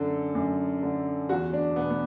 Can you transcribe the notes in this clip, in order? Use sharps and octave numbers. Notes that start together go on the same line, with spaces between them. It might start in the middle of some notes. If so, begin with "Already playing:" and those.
Already playing: F#2 D3 A4
F#2
D3
E2 F#4
D4
B2 B3
B3